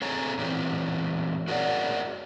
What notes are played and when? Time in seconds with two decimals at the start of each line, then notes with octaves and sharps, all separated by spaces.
0.02 C4 G#4 A4 C#5 G#5 A#5
0.38 A#2 E3 C4 G4
1.48 F#4 G#4 A#4 C#5 D5 F#5